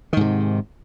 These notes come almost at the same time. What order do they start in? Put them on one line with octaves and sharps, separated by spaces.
D#3 G#2 C3